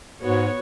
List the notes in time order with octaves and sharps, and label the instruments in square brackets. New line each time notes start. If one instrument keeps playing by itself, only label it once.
[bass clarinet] G#2 [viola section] B3 F#4 C#5